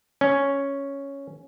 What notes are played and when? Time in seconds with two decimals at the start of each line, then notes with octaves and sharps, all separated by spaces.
0.21 C#4